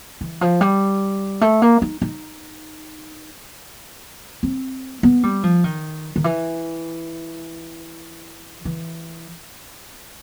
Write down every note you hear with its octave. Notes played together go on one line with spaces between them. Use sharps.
E3
F3
G3
A3
A#3
D#4
D#4
C4
B3
G3
F3
D#3
D#3
E3
E3